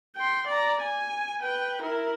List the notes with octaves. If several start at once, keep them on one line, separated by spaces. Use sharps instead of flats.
G5 C6
D5 A#5
G#5
B4 G5
E4 A#4